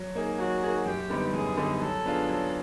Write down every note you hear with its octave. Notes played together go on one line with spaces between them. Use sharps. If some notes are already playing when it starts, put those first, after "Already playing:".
Already playing: F#3
A#3 D#4 G#4
F#3 F#4
A#3 D#4 G#4
F#2 G4
D3 G3 B3 D#4
F#2 G#4
D3 G3 B3 D#4
F#3 A4
B3 D4 F4 G#4
F#3